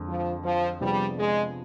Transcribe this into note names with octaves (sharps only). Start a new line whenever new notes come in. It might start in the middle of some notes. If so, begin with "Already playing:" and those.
Already playing: F2 D3 G#3
F3
F3
C3 F3 G3 B3 D4 G#4
G#3